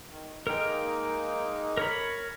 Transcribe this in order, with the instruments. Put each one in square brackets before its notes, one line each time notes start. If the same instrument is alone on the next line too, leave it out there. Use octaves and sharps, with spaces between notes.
[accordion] D#3
[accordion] G#3 A#3 D#4 [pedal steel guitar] A#4 G5
[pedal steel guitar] A#4 C#5 B5